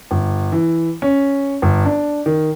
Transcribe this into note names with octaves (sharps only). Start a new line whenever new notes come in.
G1
E3
C#4
G1
D4
D#3